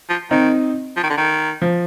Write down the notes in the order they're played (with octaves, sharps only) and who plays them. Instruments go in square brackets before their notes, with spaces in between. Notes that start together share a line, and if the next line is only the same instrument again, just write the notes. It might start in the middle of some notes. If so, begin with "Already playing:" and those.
[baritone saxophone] F3
[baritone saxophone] D#3 [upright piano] C4 D#4
[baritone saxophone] F3
D#3
D3
D#3
[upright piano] F3